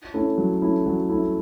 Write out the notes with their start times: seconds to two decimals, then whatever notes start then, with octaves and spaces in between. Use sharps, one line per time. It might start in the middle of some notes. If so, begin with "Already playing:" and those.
0.14 A3 C#4 E4
0.38 F#3
0.62 A3 C#4 E4
0.86 F#3
1.09 A3 C#4 E4